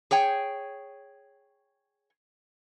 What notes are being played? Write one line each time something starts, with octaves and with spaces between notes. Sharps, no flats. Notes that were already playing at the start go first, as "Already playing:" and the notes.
G#4 C#5 G5